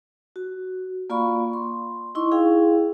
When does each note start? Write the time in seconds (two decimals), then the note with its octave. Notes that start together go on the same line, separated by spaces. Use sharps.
0.36 F#4
1.10 A#3 F4 D5 F5 B5 C#6
1.53 C6
2.15 D#4 E4 D#5 C6 C#6
2.31 E4 G#4 F5 G5